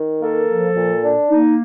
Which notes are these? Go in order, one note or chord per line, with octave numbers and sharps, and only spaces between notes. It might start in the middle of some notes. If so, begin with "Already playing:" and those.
Already playing: D#3
A#3 A4
F3
A#2
D4
A#3 D#4